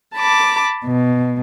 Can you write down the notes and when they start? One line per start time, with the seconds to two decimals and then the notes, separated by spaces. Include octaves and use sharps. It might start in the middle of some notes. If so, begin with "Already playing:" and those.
0.15 A5 B5 D6
0.84 B2